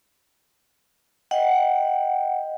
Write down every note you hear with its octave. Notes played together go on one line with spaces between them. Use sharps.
D#5 F#5 G5